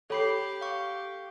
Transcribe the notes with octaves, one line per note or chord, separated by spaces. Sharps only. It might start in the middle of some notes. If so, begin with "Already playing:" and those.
G4 A4 C#5 B5 C7
F5 C#6